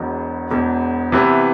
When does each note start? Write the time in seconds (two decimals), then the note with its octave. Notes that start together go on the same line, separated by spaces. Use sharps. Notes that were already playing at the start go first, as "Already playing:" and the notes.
Already playing: E1 E2 B2
0.50 E1 E2 B2
1.12 C3 E3 B3 E4